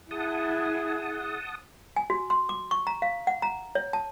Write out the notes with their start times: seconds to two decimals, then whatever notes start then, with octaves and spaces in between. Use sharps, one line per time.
0.11 E4 G#4 F#5 A5 D#6
1.96 G#5
2.10 F#4
2.30 C6
2.49 D6
2.71 C#6
2.87 A#5
3.02 F5
3.27 F#5
3.42 A#5
3.75 C#5
3.93 A5